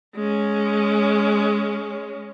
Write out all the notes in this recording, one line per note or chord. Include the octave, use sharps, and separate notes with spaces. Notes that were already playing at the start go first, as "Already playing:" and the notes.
G#3 C#4